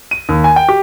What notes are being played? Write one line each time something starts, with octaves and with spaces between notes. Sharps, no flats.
D#7
D#2
G#5
G5
G4